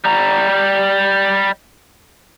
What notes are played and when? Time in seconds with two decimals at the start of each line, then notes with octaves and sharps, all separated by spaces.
0.05 G3 A#5